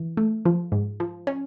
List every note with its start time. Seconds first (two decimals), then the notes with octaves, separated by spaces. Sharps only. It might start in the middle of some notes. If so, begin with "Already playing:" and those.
Already playing: E3
0.17 A3
0.45 F3
0.72 G#2
1.00 F3
1.27 C#4